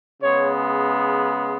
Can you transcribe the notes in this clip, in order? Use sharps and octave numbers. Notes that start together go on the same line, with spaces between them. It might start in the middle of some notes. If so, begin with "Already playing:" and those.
C#3 G#3 B3 C#5